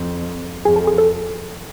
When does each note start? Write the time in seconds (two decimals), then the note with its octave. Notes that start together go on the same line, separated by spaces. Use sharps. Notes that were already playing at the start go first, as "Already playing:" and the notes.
Already playing: F2
0.65 F2 G#4
0.76 A4
0.87 G#4
0.98 A4